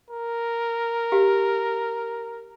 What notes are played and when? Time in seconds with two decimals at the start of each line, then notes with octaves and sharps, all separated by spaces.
0.10 A#4
1.12 G4 F5